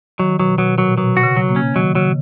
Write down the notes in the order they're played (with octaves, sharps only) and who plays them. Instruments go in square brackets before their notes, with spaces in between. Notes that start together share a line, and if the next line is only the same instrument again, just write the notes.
[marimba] D#3 [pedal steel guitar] F#3
[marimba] B2 [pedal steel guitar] F#3
[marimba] B2 [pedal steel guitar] F#3
[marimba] A#2 [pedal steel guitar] F#3
[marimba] B2 [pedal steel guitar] F#3
[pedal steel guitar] F#4
[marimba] C#3
[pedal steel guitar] F#3
[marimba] A#3
[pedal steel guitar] C#4
[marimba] D#3 [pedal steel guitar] F#3
[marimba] C#3 [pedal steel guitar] F#3